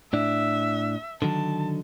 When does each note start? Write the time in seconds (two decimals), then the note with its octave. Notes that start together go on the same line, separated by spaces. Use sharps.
0.13 A2 D4 E5
1.22 D3 D#3 F#3 A5